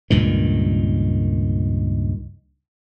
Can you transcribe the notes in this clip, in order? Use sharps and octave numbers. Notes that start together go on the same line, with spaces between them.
C#2 G2 A#2 D#3